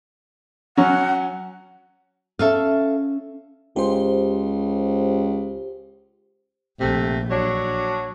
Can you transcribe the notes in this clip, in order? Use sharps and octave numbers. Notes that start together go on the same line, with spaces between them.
F#3 C#4 F#5
C#4 A4 E5 F5
C#2 G4 C5
A#1 C3 A3
F#3 D4 C#5